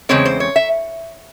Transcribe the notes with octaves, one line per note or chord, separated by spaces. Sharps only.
E2 C#3 G#3 C4 C#5
C5
C#5
E5